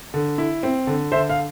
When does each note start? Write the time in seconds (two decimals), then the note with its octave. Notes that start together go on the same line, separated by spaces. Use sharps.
0.14 D3
0.38 E4
0.63 C4
0.87 D3
1.12 D3 C5 E5
1.29 F5